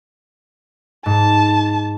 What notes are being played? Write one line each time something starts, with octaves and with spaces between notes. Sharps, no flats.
G#2 A5